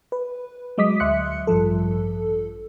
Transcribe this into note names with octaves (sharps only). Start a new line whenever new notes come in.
B4
F#3 G#3 D#5 D6 D#6 B6
D2 E5 C6 F#6 C#7
A1 G2 F3 A4